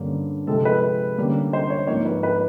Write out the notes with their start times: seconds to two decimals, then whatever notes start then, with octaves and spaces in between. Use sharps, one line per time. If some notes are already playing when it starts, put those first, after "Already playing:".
Already playing: G2 D3 G3 A#3 C#4
0.47 C3 F3 G#3 C4 A4
0.65 B4
1.18 D3 G3 A#3 C#4
1.53 C5
1.70 C#5
1.87 G#2 F3 A#3 C#5
2.05 B4
2.23 B4